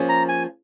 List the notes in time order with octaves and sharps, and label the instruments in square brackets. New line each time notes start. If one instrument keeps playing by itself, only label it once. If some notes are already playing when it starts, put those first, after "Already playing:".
Already playing: [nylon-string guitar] F3 A#3 C#4 G#4
[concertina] A#5
G#5